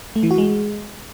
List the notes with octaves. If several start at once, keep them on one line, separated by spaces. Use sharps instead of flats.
A3
E3
F#4
G#3